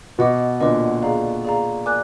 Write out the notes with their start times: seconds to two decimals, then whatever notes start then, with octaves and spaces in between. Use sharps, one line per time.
0.18 B2 B4 D#5 F#5 D6
0.60 A#2 D3 B4 D#5 F#5 D6
1.02 G#4 D5 F5 A#5
1.45 G#4 D5 F5 A#5
1.86 A#4 D5 G#5 D6 F#6